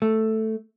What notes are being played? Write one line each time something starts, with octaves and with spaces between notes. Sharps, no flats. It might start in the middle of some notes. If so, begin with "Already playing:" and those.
A3